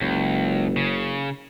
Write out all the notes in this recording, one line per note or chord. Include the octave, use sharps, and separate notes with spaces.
F#1 C#2
C#3